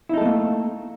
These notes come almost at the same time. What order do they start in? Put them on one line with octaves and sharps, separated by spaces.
E4 D#4 A4 A3 A#3